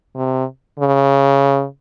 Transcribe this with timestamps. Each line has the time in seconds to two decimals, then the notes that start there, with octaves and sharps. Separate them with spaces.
0.16 C3
0.79 C#3